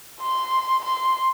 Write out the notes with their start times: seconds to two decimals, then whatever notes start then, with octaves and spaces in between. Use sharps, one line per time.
0.21 C6
0.85 C6